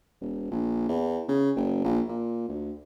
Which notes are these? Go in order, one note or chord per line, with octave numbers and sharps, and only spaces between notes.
E1
A#1
E2
C#3
F#1
A#1
A#2
D2